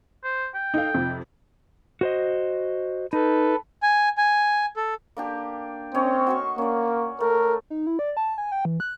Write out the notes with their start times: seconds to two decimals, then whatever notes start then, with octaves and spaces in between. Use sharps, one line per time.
0.24 C5
0.55 G5
0.74 D#4 A4 F5
0.94 F2 C3
2.01 F#4 C5 D#5
3.13 D#4 A4 B4
3.83 G#5
4.17 G#5
4.77 A4
5.17 A#3 D4 G4
5.95 C4 C#4 C#5 D#5
6.27 F#4 C6 C#6
6.58 A#3 C#4 D5
7.20 A3 A#4
7.70 D#4
7.87 E4
7.99 D5
8.17 A5
8.38 G#5
8.52 G5
8.65 E3
8.80 F#6